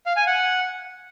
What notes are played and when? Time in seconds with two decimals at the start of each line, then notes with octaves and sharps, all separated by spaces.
0.06 F5
0.16 G#5
0.27 F#5